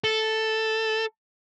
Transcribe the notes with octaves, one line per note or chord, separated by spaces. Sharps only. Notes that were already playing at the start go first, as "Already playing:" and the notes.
A4